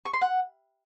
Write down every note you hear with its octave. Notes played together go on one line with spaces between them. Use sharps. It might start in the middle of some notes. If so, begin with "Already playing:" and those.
C#6
C6
F#5